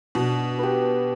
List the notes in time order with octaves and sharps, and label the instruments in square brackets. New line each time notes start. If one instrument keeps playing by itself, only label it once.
[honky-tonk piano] B2 [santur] D4
[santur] G4 B4